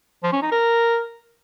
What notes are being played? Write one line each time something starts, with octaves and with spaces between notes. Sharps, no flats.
F3
C#4
D#4
A#4